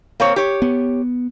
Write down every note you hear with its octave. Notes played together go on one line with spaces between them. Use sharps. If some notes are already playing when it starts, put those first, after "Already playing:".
A#3 C4 C#5
G4 C#5
B3